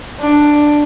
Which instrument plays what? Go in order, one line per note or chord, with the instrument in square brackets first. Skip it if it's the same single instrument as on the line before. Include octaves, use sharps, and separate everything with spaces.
[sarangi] D4